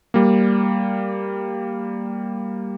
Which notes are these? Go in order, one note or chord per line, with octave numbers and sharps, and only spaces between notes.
G3 A#3